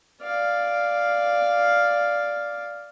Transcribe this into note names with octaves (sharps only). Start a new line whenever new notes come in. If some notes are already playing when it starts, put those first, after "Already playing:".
D5 F5